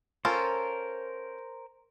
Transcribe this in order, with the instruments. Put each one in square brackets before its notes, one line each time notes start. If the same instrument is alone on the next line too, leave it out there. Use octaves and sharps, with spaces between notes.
[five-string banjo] C#4 F4 A4 [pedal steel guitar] A#4 C5